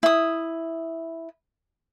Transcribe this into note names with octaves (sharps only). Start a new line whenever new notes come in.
E4 D#6